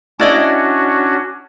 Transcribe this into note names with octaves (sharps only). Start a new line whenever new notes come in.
C#4 D4 E4 F#4 D5 D#5